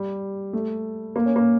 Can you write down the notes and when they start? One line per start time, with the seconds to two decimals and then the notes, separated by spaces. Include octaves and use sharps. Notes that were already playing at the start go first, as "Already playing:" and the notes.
Already playing: G3
0.53 A3
1.16 A#3
1.26 C#4
1.36 A#3